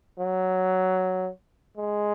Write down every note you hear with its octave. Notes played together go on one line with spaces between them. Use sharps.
F#3
G#3